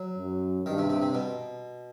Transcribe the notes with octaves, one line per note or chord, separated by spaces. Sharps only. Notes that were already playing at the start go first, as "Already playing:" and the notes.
Already playing: F#3
F#2
G2 D#3
C3
C3
C3
B2